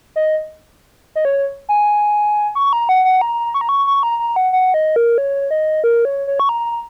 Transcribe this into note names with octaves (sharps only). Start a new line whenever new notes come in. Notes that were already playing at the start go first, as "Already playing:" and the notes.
D#5
D#5
C#5
G#5
C#6
A#5
F#5
F#5
A#5
C#6
A#5
C#6
C#6
A#5
A#5
F#5
F#5
D#5
A#4
C#5
D#5
A#4
C#5
C#5
C#6
A#5